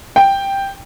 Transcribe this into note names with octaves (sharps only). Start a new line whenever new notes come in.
G5